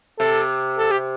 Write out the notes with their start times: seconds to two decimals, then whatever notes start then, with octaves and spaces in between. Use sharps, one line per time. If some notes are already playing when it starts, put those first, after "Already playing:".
0.19 C3 A4
0.78 A4
0.91 G4